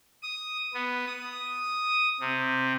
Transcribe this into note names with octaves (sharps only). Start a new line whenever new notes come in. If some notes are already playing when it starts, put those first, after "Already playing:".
D#6
B3
D#6
C3